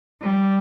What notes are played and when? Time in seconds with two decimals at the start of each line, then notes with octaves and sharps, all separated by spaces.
0.22 G3